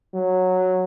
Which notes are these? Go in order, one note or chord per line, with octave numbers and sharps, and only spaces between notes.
F#3